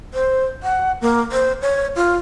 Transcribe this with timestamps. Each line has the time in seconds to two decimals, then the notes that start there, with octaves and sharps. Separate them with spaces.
0.14 C5
0.63 F#5
1.01 A#3
1.32 C5
1.62 C#5
1.96 F4